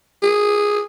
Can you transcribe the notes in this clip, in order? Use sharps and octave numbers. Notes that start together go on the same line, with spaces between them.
G#4